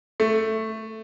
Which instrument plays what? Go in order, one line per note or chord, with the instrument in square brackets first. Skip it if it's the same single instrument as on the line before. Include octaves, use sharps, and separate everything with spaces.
[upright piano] A3